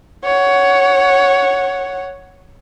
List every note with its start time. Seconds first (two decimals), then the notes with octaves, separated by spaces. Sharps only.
0.24 C#5 F#5